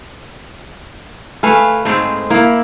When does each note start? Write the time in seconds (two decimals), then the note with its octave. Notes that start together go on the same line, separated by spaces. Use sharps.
1.43 A3 B4 F5 G#5
1.85 G#2 G#3 A3 C4
2.30 A#3 E4